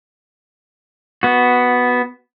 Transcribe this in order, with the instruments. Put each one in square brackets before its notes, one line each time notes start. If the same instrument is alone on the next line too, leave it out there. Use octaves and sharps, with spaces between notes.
[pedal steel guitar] B3 F#4